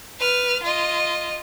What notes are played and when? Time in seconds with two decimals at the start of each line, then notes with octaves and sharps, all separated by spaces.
0.19 B4 F6
0.63 F4 D#5